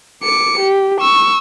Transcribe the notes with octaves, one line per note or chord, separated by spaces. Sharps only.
D6 C#7
G4
C#6 E6